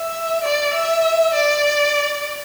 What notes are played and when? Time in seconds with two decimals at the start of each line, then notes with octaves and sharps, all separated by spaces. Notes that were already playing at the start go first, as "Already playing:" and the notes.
Already playing: E5
0.43 D5
0.74 E5
1.34 D5